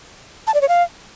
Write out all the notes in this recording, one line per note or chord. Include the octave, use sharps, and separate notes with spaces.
A5
D5
C#5
F5